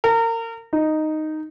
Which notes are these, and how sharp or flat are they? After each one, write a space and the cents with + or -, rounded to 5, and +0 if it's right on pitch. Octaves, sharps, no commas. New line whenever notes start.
A#4 -30
D#4 -5